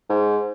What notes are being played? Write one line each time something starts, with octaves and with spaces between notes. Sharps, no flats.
G#2